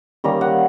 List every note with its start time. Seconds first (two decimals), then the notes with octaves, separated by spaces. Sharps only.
0.24 D#3 G3 A#3 C#4 A#5
0.41 F#5